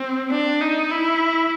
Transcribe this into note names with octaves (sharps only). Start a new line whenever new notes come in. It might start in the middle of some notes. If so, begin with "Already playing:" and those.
Already playing: C4
D4
D#4
E4